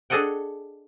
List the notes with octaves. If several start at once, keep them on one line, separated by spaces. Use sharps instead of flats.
D4 G#4 A4 D#5 F#5 G5